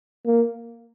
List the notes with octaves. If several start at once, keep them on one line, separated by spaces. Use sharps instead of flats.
A#3